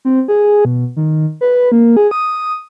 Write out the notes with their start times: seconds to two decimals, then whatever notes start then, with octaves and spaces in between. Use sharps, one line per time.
0.05 C4
0.28 G#4
0.65 B2
0.96 D#3
1.41 B4
1.72 A#3
1.97 G#4
2.11 D#6